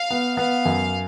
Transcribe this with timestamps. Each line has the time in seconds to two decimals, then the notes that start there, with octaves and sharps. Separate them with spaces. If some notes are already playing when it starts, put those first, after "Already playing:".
Already playing: F5
0.11 B3
0.37 B3 F5
0.65 F#2